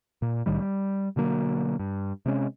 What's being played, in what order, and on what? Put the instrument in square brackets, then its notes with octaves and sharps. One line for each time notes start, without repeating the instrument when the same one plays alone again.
[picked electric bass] A#2
C2 A2 D#3 G3
G3
B2 D3 F#3 A#3
G2
C3 G#3 C#4